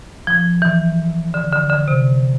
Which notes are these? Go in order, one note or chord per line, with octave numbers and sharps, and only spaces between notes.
F3
E3
D3
D3
D3
C3